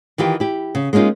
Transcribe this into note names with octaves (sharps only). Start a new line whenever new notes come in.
D#3 E3 F4 G4
E4 G4
C#3
G#3 A#3 C#4 D#4 F4